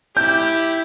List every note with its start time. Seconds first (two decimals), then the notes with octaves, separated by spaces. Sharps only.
0.17 E4 G4 G6